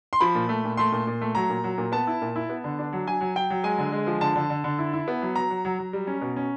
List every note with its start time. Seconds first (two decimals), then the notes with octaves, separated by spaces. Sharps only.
0.13 C6
0.20 F3 B5
0.35 A#2
0.49 A3
0.64 A#2
0.77 A3 C6
0.92 A#2
1.07 A#2
1.21 A3
1.35 F#3 A#5
1.50 A#2
1.64 F#3
1.78 A#2
1.92 B3 A5
2.07 E4
2.22 A#2
2.36 E4
2.49 B3
2.64 D3
2.79 D4
2.93 F#3
3.07 F#3 G#5
3.21 F#3
3.35 F#3 G5
3.50 F#3
3.64 G#3 G#5
3.78 D3
3.92 G#3
4.07 F3
4.21 D3 A5
4.36 D3
4.50 D3
4.64 D3
4.79 E4
4.93 E4
5.08 B3
5.22 F#3
5.36 F#3 A#5
5.50 F#3
5.65 F#3
5.79 F#3
5.93 G3
6.07 C#4
6.21 B2
6.36 C#4